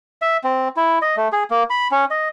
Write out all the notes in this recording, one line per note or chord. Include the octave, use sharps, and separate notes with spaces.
E5
C4
E4
D#5
A3
G#4
A#3
B5
C#4
D#5